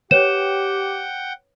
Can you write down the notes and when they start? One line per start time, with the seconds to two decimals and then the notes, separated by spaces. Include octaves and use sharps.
0.11 G4 B4 C#5 F#5 G5 E7